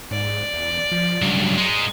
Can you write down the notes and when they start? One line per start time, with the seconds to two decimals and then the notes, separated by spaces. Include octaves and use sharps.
0.11 G#2 D5
0.54 E2
0.91 F3
1.22 C#2 G2 F#3
1.58 G#3 D#4